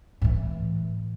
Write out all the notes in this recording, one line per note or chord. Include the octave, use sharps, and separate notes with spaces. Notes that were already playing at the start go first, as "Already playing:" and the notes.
A2 E3